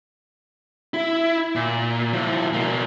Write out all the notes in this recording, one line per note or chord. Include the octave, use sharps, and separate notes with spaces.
E4
A#2
F3 E4
B2 A#3